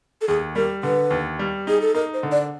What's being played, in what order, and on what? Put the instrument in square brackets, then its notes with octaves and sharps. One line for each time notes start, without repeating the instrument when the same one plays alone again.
[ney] A4
[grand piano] D#2 [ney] G#4
[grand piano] G3 [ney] A#4
[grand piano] D3 [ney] B4
[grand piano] D#2
G3
[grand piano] D#4 [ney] G#4
[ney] A4
[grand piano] D#4 [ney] A#4
[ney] C5
[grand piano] D3
[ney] D5